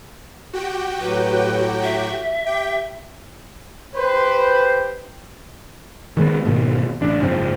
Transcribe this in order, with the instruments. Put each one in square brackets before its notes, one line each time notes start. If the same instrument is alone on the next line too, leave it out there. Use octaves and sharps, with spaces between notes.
[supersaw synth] F#4 G4 G5
[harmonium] A2 F#3 [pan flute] B4
[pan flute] E5
[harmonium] G4 [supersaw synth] G5
[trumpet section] G4 C5 [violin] B4
[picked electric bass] D#3 G#3 B3
G#2 B2 D#3
A1 D4
F#1 G#2 F3 C4